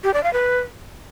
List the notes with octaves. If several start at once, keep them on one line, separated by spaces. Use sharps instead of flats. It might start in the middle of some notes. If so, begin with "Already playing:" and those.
G4
D5
F5
B4